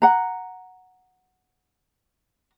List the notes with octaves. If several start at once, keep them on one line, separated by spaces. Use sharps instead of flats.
F#5 A#5